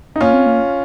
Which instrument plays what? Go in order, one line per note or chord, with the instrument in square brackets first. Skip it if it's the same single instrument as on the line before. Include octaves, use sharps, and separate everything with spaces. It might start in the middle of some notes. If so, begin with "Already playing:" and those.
[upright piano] D#4
[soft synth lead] A#3 [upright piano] C#4 F4
[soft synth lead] C4
A#3